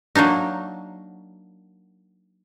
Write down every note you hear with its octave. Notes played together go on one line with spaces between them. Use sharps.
F#3 A#3 D4 D#4